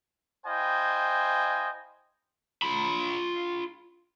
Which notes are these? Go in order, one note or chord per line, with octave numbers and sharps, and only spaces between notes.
E4 C5 D#5 F5 G5 G#5
F4 B5